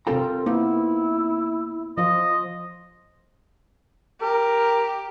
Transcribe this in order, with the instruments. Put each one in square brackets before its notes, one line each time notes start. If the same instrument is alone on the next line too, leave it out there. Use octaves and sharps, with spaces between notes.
[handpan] C3 C4 F4 [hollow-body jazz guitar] A4 G5 A#5 [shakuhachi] A#4
[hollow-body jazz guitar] A#3 D#4 [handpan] B3 [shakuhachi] E4
[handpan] F3 F4 [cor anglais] D#5
[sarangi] G4 [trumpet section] A#4